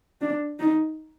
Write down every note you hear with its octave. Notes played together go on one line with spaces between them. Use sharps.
D4
D#4